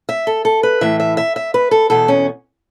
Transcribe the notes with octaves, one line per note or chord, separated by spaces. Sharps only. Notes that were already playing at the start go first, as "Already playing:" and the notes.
E5
A4
A4
B4
A2 E3 E5
E5
E5
E5
B4
A4
E2 B2 A4
C#4